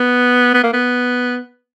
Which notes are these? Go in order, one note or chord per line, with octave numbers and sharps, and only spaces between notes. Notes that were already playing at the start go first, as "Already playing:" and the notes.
Already playing: B3
B3
A#3
B3